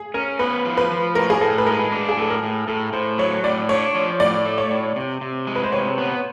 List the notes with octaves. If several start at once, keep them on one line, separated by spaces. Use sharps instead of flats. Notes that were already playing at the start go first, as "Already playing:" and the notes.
Already playing: G#4
C#4 A#4
B3 B4
F3
B4
F3
A2 A#4
G#4
A2 A4
B4
G#3 A#4
D4
G#4
A2 A4
A#4
A2
A2 A4
A2 C5
F#3 C#5
A2 D5
D4 C#5
F3
A2 D5
A3
C#5
A2
C3
C3
G#3
B4
C5
C3 C#5
B3